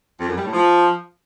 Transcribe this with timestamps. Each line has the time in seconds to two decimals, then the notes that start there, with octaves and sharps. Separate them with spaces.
0.19 F2
0.28 F#2
0.36 G3
0.44 A2
0.53 F3